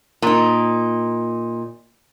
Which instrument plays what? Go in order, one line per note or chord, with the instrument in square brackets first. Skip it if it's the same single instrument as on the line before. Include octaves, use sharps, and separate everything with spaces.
[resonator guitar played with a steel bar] A#2 D#4